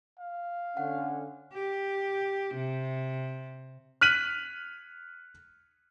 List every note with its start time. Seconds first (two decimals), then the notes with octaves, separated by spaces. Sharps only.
0.19 F5
0.77 D3 C#4 F#5
1.53 G4
2.54 C3
4.01 F6 F#6 B6 D#7 F#7